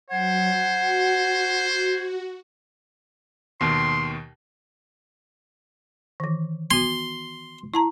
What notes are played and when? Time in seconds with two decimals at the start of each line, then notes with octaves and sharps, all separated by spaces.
0.10 F#3 C5 F#5 G#6
0.74 F#4
3.61 D#2 B2 D#3 C6
6.20 D#3 E3
6.71 B3 F#4 C6
7.74 E4 A5 A#5